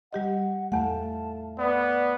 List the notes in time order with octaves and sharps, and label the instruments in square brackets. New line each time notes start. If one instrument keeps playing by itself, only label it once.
[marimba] G3 G4 D#5 [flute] F#5
[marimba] E2 F#5 [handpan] A3 F5 [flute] A5
[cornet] B3 [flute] D5